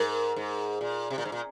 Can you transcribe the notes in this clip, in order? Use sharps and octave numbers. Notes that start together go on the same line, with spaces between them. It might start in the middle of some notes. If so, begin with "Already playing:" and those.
Already playing: G#2 A#4
G#2
A#2
C3
A#2
G#2
A#2